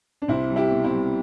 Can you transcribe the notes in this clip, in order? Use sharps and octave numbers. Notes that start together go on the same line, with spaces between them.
D4
C2 C4 E4
G3
E4 G4
B2
C4 E4
G3